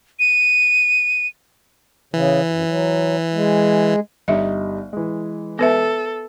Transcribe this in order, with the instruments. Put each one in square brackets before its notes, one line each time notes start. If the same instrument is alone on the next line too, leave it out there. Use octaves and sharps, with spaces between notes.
[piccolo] D#7
[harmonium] C#3 [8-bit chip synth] E3
[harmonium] F#2
F#3
G#3
[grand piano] G1 G3 D#4 [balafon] D#5 E5
[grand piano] E3 G#3
[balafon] B3 B4 E5 [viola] A4